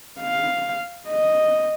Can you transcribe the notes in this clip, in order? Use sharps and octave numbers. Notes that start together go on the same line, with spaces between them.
F5
D#5